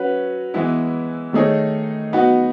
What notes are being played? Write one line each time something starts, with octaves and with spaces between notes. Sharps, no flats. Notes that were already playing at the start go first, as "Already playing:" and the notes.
Already playing: F#3 C#4 F#4 B4
E3 G#3 B3 E4
D#3 A3 D#4 G#4 C#5
F#3 B3 D#4 F#4